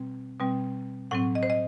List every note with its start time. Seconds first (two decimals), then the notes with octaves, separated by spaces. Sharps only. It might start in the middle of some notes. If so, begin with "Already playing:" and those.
Already playing: B2 G3 C4
0.39 B2 G3 C4
1.11 A2 F#3 C4 F#5
1.35 D#5
1.43 C5
1.50 D#5